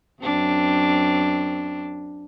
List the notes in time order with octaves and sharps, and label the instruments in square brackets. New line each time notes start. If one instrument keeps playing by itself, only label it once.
[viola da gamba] F#2 C4 D4